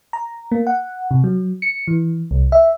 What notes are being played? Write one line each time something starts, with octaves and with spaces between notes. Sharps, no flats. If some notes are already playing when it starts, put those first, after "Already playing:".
A#5
A#3
F#5
C3
F#3
C#7
E3
C2
E5